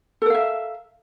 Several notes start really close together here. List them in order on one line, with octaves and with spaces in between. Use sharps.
A4 A#4 F5 E5